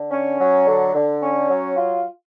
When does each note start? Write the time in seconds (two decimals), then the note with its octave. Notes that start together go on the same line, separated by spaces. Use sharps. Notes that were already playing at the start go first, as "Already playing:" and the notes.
Already playing: D3
0.11 C#4
0.39 F#3
0.66 D3
0.94 D3
1.22 C#4
1.49 F#3
1.77 F4